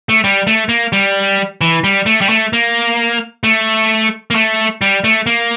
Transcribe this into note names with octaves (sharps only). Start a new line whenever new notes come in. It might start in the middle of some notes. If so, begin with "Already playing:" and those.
A3
G3
A3
A#3
G3
E3
G3
A3
G3
A3
A#3
A3
A#3
A3
G3
A3
A#3